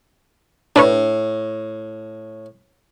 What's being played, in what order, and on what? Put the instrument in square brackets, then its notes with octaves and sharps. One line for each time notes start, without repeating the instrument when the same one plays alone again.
[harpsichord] A2 [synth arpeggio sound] D4 B4 C#5